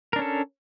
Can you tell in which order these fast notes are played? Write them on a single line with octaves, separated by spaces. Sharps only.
A#4 D4 C#4 A4